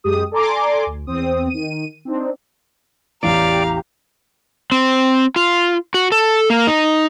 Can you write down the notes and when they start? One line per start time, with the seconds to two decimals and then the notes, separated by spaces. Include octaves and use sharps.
0.04 F#2 G#3 G4 D#6
0.31 A4 D5 G#5 A#5 C6 D6
0.86 D2
1.07 E2 C4 D#6
1.49 D#3 D#7
2.05 C4 D4 D#4
3.23 A1 E2 E3 G4 D5 F5 A#5
4.72 C4
5.36 F4
5.94 F#4
6.12 A4
6.50 A#3
6.67 D#4